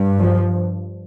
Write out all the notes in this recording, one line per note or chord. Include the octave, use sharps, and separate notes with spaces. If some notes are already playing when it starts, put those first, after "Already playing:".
Already playing: G2
F3